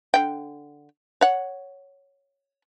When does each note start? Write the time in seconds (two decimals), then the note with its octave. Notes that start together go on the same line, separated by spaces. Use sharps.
0.14 D3 G5
1.21 C#5 F#5